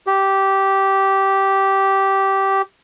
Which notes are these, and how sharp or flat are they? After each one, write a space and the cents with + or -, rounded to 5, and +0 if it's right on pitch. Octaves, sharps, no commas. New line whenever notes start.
G4 -10